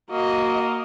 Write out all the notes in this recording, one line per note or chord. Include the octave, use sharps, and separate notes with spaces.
A#3 F#4 D#5